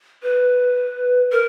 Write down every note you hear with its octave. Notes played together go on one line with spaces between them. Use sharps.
B4
A#4